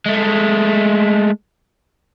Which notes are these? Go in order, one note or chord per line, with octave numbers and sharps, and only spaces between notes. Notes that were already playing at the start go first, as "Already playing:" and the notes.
G#3 A3